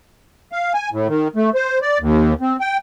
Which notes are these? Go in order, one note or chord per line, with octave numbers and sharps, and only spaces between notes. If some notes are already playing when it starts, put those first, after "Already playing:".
F5
G#5
A2
D#3
A3
C5
D5
D#2
C4
G5